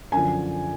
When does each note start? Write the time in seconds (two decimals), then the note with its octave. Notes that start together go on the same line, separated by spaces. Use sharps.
0.12 F#2 D3 F3 G#5